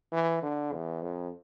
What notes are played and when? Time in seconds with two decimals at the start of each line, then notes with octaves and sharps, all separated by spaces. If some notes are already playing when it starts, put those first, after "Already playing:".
0.12 E3
0.43 D3
0.73 E2
1.02 F2